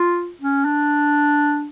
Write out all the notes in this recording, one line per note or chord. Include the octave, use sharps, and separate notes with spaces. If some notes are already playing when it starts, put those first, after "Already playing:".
Already playing: F4
C#4
D4